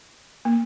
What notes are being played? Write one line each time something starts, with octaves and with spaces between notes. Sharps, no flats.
A#3